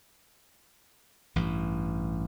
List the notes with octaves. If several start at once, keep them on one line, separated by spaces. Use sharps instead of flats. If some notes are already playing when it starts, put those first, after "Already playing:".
A1 G2 E3